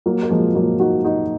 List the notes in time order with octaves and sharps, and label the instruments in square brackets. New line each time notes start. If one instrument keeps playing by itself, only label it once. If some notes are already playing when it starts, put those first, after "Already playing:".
[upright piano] F#3 A#3
A#3
F3 G#3
F#3 A#3
D#4 F#4
D#4 F#4